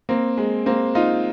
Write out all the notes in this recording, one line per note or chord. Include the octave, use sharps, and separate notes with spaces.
A#3 C4
G#3
A#3 C4
D#4 F4